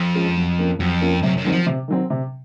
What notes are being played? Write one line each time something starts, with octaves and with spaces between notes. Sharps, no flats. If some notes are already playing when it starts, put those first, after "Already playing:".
Already playing: F2
F3 G#3 C#4 F4
F#3
A#3 C#4 F4
F2 F#3
A#3 C#4 F4
F#2 C3
F#2
D#3 F#3 C4
F3
C3
D#3 F#3 C4
C3